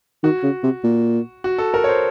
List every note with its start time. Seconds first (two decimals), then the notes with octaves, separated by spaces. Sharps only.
0.23 D#3 F#4
0.43 C#3
0.63 C3
0.84 A#2
1.44 F#4
1.58 A4
1.74 A#4
1.84 C#5
1.88 C5